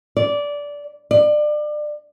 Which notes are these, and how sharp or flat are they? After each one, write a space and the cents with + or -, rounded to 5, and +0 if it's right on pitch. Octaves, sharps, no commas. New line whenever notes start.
D5 -15
D5 +30